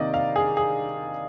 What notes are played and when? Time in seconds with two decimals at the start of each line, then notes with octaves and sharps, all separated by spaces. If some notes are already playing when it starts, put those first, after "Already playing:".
Already playing: C3 D#3 A#3 D5 D#5
0.14 F5
0.36 G#4
0.57 G#4